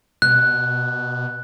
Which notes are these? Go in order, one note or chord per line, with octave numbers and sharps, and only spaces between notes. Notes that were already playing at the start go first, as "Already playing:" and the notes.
B2 F#6